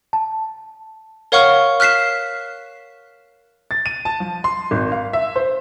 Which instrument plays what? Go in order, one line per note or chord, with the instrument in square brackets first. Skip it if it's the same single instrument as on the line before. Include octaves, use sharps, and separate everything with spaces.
[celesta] A5
[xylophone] A#4 C#5 F5 F#5 C#6 F6
F6 F#6 B6 C7 E7
[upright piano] A6
D#7
A5
F3
C6
G#1
F5
E5
C5